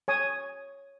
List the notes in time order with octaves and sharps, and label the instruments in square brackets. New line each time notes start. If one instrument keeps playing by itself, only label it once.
[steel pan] C#5 G#5 D#6